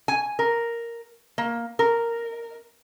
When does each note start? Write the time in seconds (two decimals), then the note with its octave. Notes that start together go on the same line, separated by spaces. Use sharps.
0.08 G#5
0.39 A#4
1.38 A#3
1.79 A#4